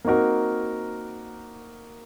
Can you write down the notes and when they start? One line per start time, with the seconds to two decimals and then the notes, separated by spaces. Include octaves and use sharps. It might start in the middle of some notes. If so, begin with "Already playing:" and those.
0.05 A#3 C4 D#4 F#4 A#4